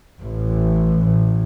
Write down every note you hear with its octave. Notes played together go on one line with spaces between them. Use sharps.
A1